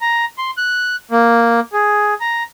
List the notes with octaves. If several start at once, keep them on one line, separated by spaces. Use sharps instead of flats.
A#5
C6
F#6
A#3
G#4
A#5